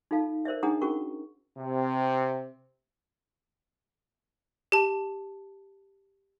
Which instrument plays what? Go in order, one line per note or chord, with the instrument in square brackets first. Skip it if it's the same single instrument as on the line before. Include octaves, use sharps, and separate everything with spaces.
[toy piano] D#4 F4 A4 F5 A5
A#4 C5 D5 E5
D4 D#4 G#4 F#5 A#5 D#6
C#4 F#4 G#4 A#4 C#6
[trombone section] C3
[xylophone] G4 A5